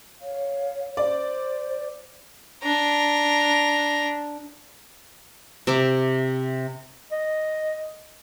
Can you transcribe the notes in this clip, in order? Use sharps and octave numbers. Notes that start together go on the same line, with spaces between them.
C#5 F5
C5 D5
D4 A#5
C3 E5 D6
D#5